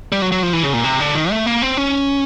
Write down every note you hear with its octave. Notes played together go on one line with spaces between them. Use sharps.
G3
F#3
F#3
F3
E3
C#3
A#2
C3
D3
D#3
A3
A#3
C4
C#4